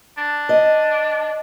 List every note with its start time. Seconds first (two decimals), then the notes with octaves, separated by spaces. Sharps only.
0.17 D4
0.49 D#5